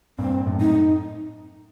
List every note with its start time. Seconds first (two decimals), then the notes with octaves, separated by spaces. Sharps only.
0.19 G2 A#2 C4
0.46 F#2 A2
0.60 D#4